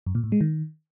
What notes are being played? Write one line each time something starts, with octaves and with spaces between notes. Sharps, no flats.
F#2
A#2
A2
G#3
D#3